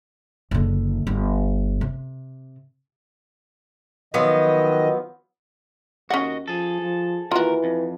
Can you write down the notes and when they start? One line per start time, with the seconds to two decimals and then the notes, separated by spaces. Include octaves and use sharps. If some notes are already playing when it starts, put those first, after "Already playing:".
0.51 F#1 D3
1.07 G1
1.81 C3
4.14 D#3 F3 F#3 B3 D#5
6.10 D#2 C#4 F#4 D#5 F#5
6.48 F3 G#4 A4
6.81 F3
7.31 D#2 E3 F4 F#4 A#4
7.64 F2